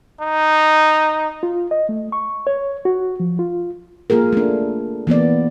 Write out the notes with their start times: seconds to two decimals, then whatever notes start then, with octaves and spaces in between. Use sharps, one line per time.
0.20 D#4
1.43 F4
1.71 D#5
1.89 A3
2.12 C#6
2.47 C#5
2.85 F#4
3.20 F3
3.39 F4
4.10 A#3 F4 G#4 A#4
4.33 A3 D4
5.07 E3 A#3 B3 D5